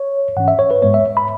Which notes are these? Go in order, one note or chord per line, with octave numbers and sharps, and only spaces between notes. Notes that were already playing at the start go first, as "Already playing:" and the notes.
Already playing: C#5
G#2 E3 C#4 F#5
E5
C#5
B4
G#2 G#3 B3 C#5
E5
B5